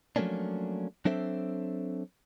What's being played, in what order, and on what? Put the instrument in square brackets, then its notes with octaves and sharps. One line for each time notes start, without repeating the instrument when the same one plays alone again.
[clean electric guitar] F3 F#3 A3 A#3 C#4 D4
F#3 C4 D4 A4 C5 E5